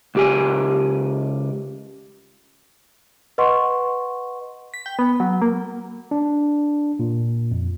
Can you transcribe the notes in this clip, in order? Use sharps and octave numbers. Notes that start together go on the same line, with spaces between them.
C#2 G4 G#5
B4 D#5 F#5 C6 C#6
B6
G5
B3
F#3
A#3
D4
A#2
F2